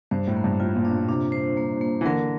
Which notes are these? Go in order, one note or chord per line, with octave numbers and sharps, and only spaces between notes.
G2 C5
A2
A#3
G2
A2 F4
A#2
D4
A#2
C3 D4
C5
A#3
A#3
E3
D3 A#4